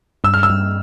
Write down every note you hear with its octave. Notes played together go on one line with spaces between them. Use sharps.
G2 E6
F6
E6
G2